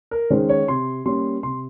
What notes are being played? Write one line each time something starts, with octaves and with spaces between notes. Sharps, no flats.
A#4
D#3 G#3 C#4 C5
C#5
C3 C6
G3 A#3 C#4 C6
C3 C6